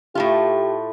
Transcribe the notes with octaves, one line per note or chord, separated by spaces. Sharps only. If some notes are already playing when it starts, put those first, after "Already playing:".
A2 A3 F4 G4